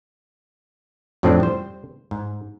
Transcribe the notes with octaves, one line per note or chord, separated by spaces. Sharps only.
F2 A2 F3 F#3 C4 D4
G3 C5
G#2